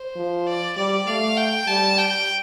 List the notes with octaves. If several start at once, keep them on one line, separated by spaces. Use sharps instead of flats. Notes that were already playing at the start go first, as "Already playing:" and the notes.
Already playing: C5
F3
D5
G3 D5
A3 F5
G5
G3 A5
G5